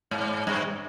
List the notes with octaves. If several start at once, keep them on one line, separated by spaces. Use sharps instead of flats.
G#2
G2